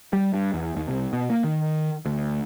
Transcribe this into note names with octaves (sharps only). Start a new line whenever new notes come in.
G3
G2
E2
D#2
C2
B2
A#3
D#3
D2